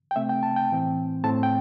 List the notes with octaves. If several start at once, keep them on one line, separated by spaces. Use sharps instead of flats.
G5
C3 A3 C4 E5
G5
A5
G5
A2 E3 C4
A2 A3 C4 A5
G5